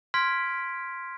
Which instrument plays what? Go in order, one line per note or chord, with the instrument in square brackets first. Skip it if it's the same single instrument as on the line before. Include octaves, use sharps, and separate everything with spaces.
[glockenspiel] C6 F6 G#6 B6 D7